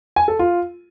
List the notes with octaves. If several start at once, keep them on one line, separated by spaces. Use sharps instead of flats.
G#5
A4
F4